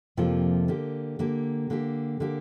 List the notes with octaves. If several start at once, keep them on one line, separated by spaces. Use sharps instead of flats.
F2 C3 F3 A#3 F4
D3 A#3 G4
D3 A#3 G4
D3 A#3 G4
D3 A#3 G4